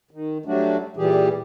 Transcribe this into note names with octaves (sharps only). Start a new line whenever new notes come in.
D#3
F#3 G3 A3 D4 F#4
A#2 E3 G3 G4 G#4